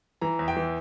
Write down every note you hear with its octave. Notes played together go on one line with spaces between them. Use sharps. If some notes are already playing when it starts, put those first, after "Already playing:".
E3 A#5
E2
G5
E3